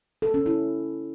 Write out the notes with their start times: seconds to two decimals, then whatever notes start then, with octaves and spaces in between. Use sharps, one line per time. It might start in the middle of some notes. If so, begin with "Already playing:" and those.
0.22 A4
0.34 C#4
0.46 E4